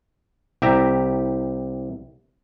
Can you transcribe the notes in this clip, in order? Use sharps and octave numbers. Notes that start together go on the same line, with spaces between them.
C2 G4 E5 A#5